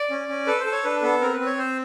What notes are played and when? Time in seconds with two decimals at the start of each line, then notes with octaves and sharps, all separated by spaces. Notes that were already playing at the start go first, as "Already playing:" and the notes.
Already playing: D5
0.10 C#4
0.28 C#4
0.47 A4 B4
0.59 C5
0.66 A4
0.72 C#5
0.84 D4 B4
1.02 B3 A4
1.21 C4 A#4
1.33 B4
1.40 C4
1.46 C#5
1.57 C4 C5